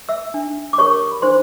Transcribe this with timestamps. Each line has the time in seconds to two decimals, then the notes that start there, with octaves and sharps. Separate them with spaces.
0.09 E5 E6
0.34 D4
0.73 D6
0.78 G4 A#4 C#5 C#6
1.12 B5
1.22 D4 C5 C6